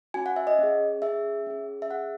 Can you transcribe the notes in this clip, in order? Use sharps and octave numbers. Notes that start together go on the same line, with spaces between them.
C#4 F#4 G#5
F#5
E5
D#5
C#4 G#4
C#4 G#4 E5
C#4 G#4
E5
C#4 G#4 F#5